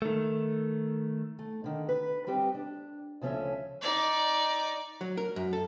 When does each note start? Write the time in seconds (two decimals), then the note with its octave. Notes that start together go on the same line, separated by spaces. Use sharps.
0.02 D#3 A3
1.39 A3
1.64 D3 D#3
1.89 B4
2.27 G3 C4 G4 B4 C5 D#5
2.55 D4
3.21 D2 C#3 F3 C#4 A4 E5
3.82 D#4 D5
5.01 F#3
5.17 A#4
5.36 F#2
5.53 A4